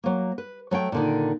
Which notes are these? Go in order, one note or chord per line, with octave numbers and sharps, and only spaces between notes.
F#3 A#3
B4
F#3 A3 C#5 G5
A#2 D3 D#3